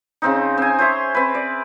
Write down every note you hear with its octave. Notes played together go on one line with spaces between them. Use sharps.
C#3 C4 D#4
C4 G#5
C5 C#5 E5 C6
C4 B4
D5